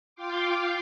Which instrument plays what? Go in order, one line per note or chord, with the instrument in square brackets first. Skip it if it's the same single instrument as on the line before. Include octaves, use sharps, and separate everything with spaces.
[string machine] F4 F5 G5 C6 D6